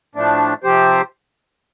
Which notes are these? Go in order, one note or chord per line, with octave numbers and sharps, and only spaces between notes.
A2 F3 A3 D4
C3 F3 C4 G4 C5